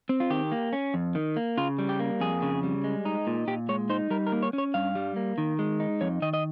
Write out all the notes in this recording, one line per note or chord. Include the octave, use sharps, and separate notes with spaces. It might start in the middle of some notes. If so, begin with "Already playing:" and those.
C4
F4
D#3 G4
A#3
C#4
F2
D#3
A#3
C#3 F4
G3
G4
A#3
F2 G#4
C#3
G3
G#3
D#4
A#2
A#2 G4
G#3 C#5
D#4 C5
G3 A#4
A#4
A#3
C#5
C#4
C#5
G2 F5
G3
A#3
D#3
G#3
D#4
F2 C#5
D#3 D#5
D#5